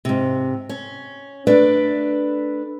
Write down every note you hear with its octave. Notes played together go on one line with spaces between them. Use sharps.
G#2 C3
C#4
A3 D4 B4 D5